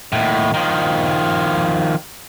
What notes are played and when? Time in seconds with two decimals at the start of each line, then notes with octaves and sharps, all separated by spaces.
0.13 D#2 A2
0.54 D#3 F3